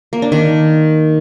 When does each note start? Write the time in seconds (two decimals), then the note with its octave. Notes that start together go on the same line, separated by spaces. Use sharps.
0.13 A#3
0.22 D4
0.32 D#3